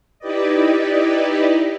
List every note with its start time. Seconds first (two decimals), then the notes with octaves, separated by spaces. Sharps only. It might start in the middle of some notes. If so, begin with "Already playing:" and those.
0.19 D#4 E4 G4 B4 D5 D#5